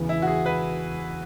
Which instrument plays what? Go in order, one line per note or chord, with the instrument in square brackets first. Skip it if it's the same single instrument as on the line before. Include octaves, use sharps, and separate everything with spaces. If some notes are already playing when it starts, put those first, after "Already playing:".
Already playing: [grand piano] E1 E2 C#3 E3 B3
[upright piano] E4
F#4
G#4
B4